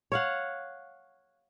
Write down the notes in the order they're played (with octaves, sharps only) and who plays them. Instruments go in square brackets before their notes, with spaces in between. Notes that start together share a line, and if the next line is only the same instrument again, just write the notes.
[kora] C#5 F5 F#5